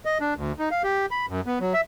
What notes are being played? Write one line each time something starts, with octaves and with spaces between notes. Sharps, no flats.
D#5
D4
D2
D#4
F5
G4
B5
F#2
B3
F#3
E5